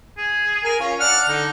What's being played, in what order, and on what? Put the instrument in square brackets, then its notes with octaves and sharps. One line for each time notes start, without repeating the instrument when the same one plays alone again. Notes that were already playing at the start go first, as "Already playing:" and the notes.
[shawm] G#4
[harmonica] A#4 G#5
C#4 F4
[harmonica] D4 F6 [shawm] F#5
[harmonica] D3 [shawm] D#4